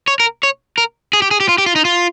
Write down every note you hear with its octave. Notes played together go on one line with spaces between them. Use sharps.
C#5
A#4
C#5
A#4
G#4
G4
G#4
G4
F4
G4
F4
D#4
F4